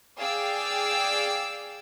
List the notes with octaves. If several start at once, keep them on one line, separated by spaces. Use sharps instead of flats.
G#4 D5 F5 G5 D6 E6